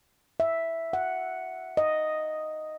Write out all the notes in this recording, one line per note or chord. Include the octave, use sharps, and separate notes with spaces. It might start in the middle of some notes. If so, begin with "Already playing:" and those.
E5
F#5
D#5